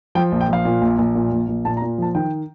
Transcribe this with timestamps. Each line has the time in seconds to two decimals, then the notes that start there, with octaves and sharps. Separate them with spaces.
0.15 F3 G5
0.32 A#1
0.41 G5
0.49 F3 F5
0.65 A#2
0.82 A#1
0.98 A#1
1.15 A#2
1.32 A#1
1.48 A#1
1.65 A#2 A5
1.77 A#5
1.82 A#2
1.98 F3 A5
2.15 D#3 G5